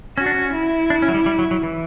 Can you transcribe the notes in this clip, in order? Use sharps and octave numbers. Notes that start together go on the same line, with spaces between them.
C#4 F#4
D4
C#4
E4
D4
C#4
F#3
G3
G3
F#3
F#3
E3